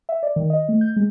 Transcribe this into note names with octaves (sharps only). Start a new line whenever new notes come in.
E5
D5
D#3
D#5
A3
G6
G#3